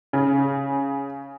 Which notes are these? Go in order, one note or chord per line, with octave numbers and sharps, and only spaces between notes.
C#3